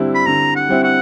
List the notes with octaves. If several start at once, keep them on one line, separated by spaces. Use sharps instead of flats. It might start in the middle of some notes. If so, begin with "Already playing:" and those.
Already playing: D3 G3 C4 E4
B5
D3 A#5
F#5
G3 C4 E4
F#5